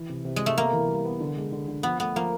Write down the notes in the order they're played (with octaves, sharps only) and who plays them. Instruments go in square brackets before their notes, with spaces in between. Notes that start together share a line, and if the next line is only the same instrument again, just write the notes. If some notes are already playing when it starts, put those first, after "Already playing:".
Already playing: [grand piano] E3
C3
C3
[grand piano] C3 [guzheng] G#3
[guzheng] A3
[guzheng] A#3 [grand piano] B3
[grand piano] E3
G3
B3
D3
G#3
D3
D3
[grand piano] F3 [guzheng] B3
[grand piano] A3 [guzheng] B3
[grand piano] F3 [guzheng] A#3